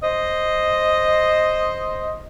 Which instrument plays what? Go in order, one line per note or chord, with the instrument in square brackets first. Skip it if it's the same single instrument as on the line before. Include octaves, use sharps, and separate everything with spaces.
[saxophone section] C5 D#5